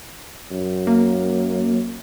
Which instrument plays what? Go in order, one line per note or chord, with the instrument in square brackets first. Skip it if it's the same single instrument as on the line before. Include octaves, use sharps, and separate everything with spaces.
[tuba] F#2
[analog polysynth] A#3